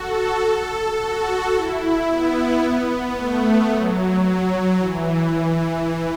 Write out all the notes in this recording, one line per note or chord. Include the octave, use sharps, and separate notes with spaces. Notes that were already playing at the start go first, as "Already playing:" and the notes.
Already playing: F#4 A4
A4
F#4
E4
B3
A3
F#3
F#3
E3